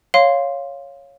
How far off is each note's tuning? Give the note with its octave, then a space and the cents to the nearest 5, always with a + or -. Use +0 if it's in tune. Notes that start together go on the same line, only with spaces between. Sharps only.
C#5 +0 F5 +0 C6 +0